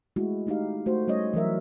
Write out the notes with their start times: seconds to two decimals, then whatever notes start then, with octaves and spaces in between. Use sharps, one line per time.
0.16 G#3 A3 E4 F#4
0.47 A3 D#4 G4 F5
0.86 A3 F#4 C5
1.07 G3 A3 C#4 C#5 D#5
1.34 E3 F#3 A#4 E5